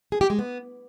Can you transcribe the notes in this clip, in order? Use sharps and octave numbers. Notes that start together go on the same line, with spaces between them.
G#4
G4
G#3
B3